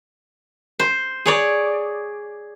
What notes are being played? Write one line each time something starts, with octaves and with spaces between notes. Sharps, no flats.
C5
G#4 C#5 D5